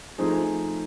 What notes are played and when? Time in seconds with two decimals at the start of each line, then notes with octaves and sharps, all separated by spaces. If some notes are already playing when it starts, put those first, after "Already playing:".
0.18 F3 A3 C4 D#4 G#4